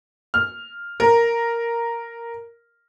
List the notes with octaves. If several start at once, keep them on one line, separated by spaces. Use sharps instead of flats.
F6
A#4